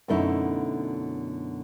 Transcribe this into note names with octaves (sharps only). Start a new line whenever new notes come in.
F#2 B2 D3 A3 D#4 E4